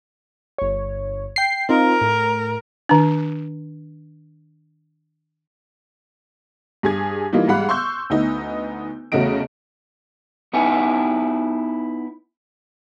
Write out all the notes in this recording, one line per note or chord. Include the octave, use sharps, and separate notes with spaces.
G1 C#5
G5 C7
C4 D#4 F4 A#4
A2
D#3 D4
G2 G#4 G#6
E3 G3 A#3 D#4 F4
G#2 G3 F5 F#5 B5 F#6
C6 C#6 E6 G6
D2 B3 D#4
E2 C#3 A3 F#4 D#5 D7
B3 D#4 E4 F#5 G#5